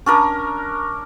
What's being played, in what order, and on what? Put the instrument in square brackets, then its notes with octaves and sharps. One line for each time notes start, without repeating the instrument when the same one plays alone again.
[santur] C#4 D4 A#4